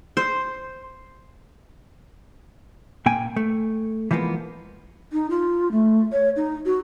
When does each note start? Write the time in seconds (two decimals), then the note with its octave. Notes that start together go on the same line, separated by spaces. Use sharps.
0.17 C5
3.06 A#2 A#3 G5 G#5
3.36 A3
4.11 E3 F3 G#3 A#3 B3
5.12 D#4
5.30 F4
5.71 A3
6.12 C#5
6.36 D#4
6.65 F#4